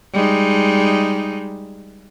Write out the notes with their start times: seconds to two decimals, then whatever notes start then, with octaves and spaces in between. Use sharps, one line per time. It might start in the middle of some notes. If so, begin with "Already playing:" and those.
0.14 G3 G#3 D#4